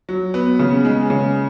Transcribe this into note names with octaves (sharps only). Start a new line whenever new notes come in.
F#3
B3
C#3
G#3
C#3